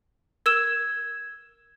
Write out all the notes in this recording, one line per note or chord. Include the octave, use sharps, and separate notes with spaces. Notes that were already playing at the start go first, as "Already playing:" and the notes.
A#4 E6 G#6 E7